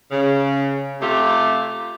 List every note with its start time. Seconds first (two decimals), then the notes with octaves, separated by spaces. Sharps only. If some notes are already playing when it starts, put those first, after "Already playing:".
0.11 C#3
1.01 C3 A3 F4 G4